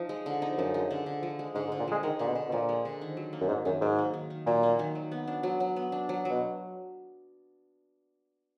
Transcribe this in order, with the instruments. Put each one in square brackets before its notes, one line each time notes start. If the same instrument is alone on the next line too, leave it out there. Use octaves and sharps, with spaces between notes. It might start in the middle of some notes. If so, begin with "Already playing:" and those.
Already playing: [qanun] F3 D#4
G#3
D3
D#4
[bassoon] F#2 [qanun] F3
[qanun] G#3
D3
D3
F3
G#3
[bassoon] G#2 [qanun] D3
[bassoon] G#2
[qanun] D3
[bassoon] A#2
[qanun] F3 [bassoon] G#3
[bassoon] D#3 [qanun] G#3
[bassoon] A#2 [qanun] D3
[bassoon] B2
[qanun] D3
[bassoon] B2
[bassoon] A#2 [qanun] F3
[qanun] G#3
D3
D#3
F#3
A#3
[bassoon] F#2
[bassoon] G#2 [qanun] D#3
[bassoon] F#2 [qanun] D#3
[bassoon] G#2 [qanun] F#3
[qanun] A#3
D#3
D#3
[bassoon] A#2 [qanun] F#3
[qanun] A#3
D#3
F#3
B3
D4
F#3
F#3
B3
D4
F#3
F#3
[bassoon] B2